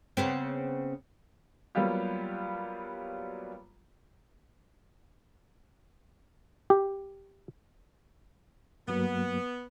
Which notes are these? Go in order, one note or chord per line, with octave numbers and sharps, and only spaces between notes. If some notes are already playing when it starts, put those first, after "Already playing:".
C#3 B3 C4
F#3 G3 A#3 B3 F4 G4
G4
G2 F#3 A#3 B3